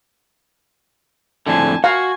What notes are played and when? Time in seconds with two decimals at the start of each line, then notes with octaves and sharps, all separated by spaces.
1.46 F2 A2 D3 G#5 A5
1.84 F#4 F5 G#5